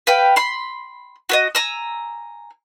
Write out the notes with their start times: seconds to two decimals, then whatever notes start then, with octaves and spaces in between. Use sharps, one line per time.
0.07 B4 F5 G5
0.36 B5 C6
1.29 F#4 B4 D#5
1.55 G#5 A#5 E6